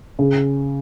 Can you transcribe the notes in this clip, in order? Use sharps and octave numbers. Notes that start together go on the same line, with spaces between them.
C#3